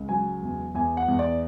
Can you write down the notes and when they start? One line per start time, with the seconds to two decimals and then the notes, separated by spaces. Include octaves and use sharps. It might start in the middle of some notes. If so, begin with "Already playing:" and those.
Already playing: C#2
0.09 F#3 G#5
0.42 E2
0.75 E2 G#5
0.97 F#5
1.08 E2
1.19 D5